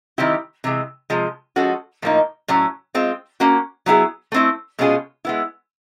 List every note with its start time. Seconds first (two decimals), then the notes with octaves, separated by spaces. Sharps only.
0.18 D#3 G3 C4 E4 G4
0.64 C3 E3 G#3
1.10 C3 F3 G#3
1.56 F3 G#3 C#4 F#4 A4
2.02 A2 F3 A#3 D#4
2.48 A2 F#3 A3 C#4
2.94 G#3 C4 F4
3.40 A#3 C#4 F#4
3.86 F#3 B3 E4 G#4
4.32 A3 C4 E4
4.79 B2 G#3 C#4 F4 G#4
5.25 G#3 B3 E4